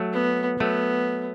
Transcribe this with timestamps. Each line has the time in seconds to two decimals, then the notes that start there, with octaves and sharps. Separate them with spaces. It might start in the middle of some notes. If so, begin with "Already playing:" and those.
Already playing: F#3 A3
0.13 B3
0.59 F#3 A3 B3